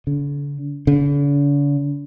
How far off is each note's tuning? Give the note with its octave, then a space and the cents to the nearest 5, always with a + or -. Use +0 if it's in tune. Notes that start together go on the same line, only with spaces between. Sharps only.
D3 -40
D3 -45